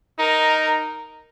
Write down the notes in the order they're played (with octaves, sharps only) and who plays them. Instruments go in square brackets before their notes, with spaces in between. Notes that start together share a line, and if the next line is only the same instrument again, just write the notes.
[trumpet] D#4 [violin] A#4